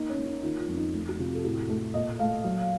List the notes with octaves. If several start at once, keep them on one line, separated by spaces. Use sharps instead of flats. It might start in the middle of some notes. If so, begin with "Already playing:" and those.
Already playing: A#3 D#4
C#4
A#3
D#4
D#3 F4
F4
F2 C#4
D#4
A3
F#4
C3 F4
A4
A2 F#4
A3 A4
A#2 D#5
A3 F5
F#3